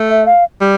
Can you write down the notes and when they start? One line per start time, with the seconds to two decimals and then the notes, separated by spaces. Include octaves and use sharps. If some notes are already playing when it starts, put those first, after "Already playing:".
Already playing: A3
0.10 E5
0.26 F5
0.61 G3